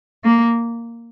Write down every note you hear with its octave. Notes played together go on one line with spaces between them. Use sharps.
A#3